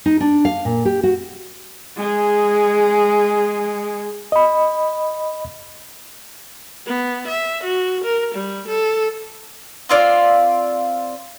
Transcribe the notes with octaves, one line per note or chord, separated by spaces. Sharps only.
D#4
D4
F5
A#2
G4
F#4
G#3 G#4
D#5 B5
B3
E5
F#4
A#4
G3
A4
C4 F4 D5